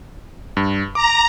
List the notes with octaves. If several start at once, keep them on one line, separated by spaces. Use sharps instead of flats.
G2
A#5 D6